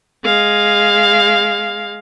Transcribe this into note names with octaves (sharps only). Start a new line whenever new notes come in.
G#3 F5